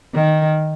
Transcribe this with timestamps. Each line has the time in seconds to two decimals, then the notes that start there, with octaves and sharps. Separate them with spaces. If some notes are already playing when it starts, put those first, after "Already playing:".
0.14 D#3